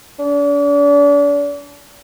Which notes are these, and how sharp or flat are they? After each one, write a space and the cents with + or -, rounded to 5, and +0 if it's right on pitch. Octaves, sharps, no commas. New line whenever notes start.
D4 -40